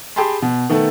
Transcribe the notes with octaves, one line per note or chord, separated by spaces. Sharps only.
G4 G#4 G5 A5 B5 C6
B2
D#3 A3 B3 A4